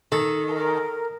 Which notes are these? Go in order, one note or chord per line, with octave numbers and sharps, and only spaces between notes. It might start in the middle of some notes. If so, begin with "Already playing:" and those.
D#3 A4
A#4